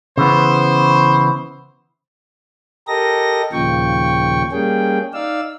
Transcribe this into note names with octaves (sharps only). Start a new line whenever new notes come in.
C#3 E3 B3 C5
G4 A4 A#4 D#5 A#6
D#2 A#2 C#3 F3 G5 C#6
G3 A#3 C#4 G#4 G5
D#4 D5 F5 E6